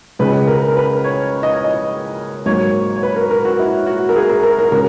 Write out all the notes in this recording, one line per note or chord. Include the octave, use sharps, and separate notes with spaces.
C#2 C#3 G#3 B4
A#4
A#4
B4
C#5
D#5
C#5
D#5
G#2 F#3 A#3 C#5
C#5
B4
A#4
A#4
F#4
E4
F#4
A#4
G#4
A#4
A#4
A#4
C#3 G#3 A#4